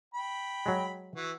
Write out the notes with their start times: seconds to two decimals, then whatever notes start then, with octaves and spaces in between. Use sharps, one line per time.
0.14 G5 B5
0.66 F#3 G#3
1.15 E3 F#4